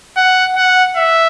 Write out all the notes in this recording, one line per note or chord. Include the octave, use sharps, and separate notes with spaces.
F#5
F#5
E5